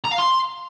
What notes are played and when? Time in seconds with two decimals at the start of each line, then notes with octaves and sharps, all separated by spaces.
0.05 A#5
0.12 F5
0.19 C6